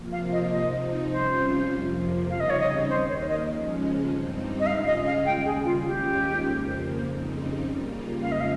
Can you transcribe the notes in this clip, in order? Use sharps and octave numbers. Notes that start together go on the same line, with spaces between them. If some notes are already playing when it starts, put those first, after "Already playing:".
Already playing: C3 F3 A#3 F4
F5
D#5
C3 F3 C4 D#4 D#5
C3 G3 C#4 F4 C5
F2 C3 F3 A#3
C#3 G3 C4 D#4 F5
D#5
C#5
D#5
D#2 D#3 A#3 C5
C#5
D#5
D#2 C#3 F3 G#3 C#4
G2 G3 C4 D#4
D#5
C#3 G#3 C#4 F4 F5
D#5
F5
D#2 C#3 G3 G5
G#4
F4
D#2 D#3 G#3 C#4 F4 G4
F2 C#3 F3 A#3
F2 C#3 G3 C4 D#4
C#3 G3 A#3 F4
F2 C#3 F3 G#3 D#4 F5
D#5
F5